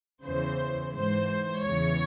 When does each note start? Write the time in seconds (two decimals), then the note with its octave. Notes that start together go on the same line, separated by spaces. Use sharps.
0.23 E2 C#3 E3 C5
0.93 G#2 E3 C5
1.64 E2 C#3 E3 C#5